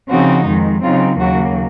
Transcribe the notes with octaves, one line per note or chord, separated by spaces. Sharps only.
C#3 F3 C4 D#4 F#4
F2 D#3 G#3
C#3 F#3 C4 D#4 F4
D#2 C#3 F#3 A#3 F#4